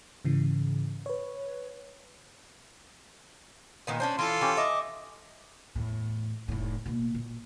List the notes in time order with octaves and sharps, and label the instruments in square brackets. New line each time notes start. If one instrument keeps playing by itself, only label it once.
[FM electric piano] G#2 C#3 E3
B4 C#5
[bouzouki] A#2 D#3 B3
C#4 D4 C5
[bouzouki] E3 [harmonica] F4 A4 C6
[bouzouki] E3 [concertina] C#4 G4
[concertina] D#5 D6 [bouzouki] E5
[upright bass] E2 A2
F1 A2
B2 A#3
A#2